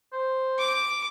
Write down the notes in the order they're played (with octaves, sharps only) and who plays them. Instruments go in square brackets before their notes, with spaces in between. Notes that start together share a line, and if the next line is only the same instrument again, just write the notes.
[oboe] C5
[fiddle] D6